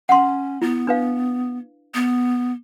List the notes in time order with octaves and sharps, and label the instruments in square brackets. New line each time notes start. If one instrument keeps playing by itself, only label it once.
[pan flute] C#4 [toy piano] F#5 C6
[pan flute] B3 [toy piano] E4
[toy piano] D4 B4 F5
[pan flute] B3